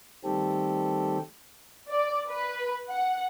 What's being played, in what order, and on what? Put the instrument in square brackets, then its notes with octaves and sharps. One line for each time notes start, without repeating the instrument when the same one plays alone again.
[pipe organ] D#3 G3 A3 C4 G4 A4
[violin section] D5
B4
F#5